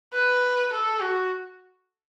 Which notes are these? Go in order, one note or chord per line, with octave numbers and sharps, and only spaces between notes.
B4
A4
F#4